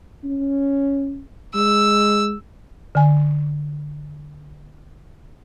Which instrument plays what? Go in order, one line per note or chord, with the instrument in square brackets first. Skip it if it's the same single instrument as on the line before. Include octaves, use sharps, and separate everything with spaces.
[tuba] C#4
[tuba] G#3 [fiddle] E6
[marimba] D3 G#5